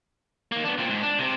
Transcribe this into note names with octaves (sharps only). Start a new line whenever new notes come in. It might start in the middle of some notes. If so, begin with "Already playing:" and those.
D#3 A#3
B3 D4
A#2 C4
G#2
D4
C3 C4